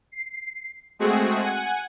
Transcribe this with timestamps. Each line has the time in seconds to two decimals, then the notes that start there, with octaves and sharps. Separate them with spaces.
0.12 C7
0.99 G#3 A3 C4 F#4 G#4
1.41 F#5 G#5